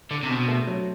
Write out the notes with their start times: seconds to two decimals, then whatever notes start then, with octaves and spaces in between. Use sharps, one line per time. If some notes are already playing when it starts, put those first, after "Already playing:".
0.11 D3 D4
0.23 C3 D4
0.29 B2 C4
0.48 A3
0.67 F#3